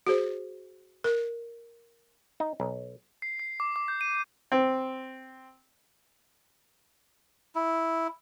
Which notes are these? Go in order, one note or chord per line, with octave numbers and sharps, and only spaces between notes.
F#4 G#4 C5
A#4
D#4
B1
C7
C7
D6
D6
G6
D#7
C4
E4